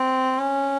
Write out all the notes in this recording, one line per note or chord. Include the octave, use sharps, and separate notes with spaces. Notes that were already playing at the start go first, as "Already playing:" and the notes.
Already playing: C4
C#4